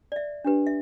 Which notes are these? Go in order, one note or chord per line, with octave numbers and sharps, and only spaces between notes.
D5
E5
D4 G4 B4
E5